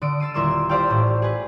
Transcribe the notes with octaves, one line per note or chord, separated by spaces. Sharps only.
D3 D#6 D7
E6 A6 C7 D#7
D#1 E4 A#4 C6 D6 E6
G4 C5 D5 F5 G5
A1 A2
G#4 B4